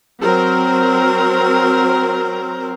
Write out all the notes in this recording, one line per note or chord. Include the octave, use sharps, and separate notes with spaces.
F#3 C4 A#4